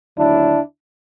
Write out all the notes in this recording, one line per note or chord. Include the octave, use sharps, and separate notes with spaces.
D#2 D3 F#3 A3 D4 E4